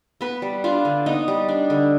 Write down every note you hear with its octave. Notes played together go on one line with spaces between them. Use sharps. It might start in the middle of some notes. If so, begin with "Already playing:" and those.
B3 B4
G3
D4 F4
D3
B3 D#4
G3
D4
D3